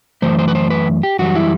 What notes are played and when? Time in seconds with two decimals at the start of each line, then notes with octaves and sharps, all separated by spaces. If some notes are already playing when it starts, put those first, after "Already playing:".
0.22 F#2 E3 A3 C5
0.39 C5
0.48 B4
0.55 C5
0.70 B4
1.03 G4
1.19 F#2 E3 G3 F#4
1.35 E4